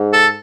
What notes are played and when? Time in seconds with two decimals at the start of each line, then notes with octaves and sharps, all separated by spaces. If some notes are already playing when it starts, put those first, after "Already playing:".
Already playing: G#2
0.13 A4